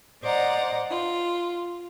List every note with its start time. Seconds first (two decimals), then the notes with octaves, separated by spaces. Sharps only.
0.24 C5 D5 D#5 F#5 A#5
0.89 F4